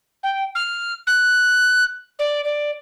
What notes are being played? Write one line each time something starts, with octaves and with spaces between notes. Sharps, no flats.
G5
F6
F#6
D5
D5